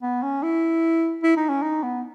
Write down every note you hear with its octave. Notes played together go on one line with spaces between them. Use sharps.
B3
C#4
E4
E4
D#4
C#4
D#4
B3